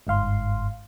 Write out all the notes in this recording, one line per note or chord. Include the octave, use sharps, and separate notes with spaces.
G1 G#2 F5 C6